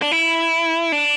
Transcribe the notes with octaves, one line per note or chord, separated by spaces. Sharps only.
D4
E4
D4